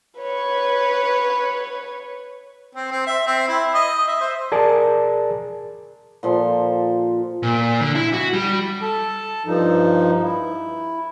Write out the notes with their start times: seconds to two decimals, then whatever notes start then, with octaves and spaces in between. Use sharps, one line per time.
0.18 B4 C#5
2.75 C4
2.91 C4
3.07 E5
3.27 C4
3.48 E4
3.74 D#5
4.08 E5
4.21 C5
4.52 G#4 A#4 D5 A5
6.23 A#2 F3 A4 C6
7.43 A#2
7.81 D3
7.95 E4
8.13 F#4
8.33 G3
8.82 A4 A5
9.46 G2 F3 D#4
10.23 E4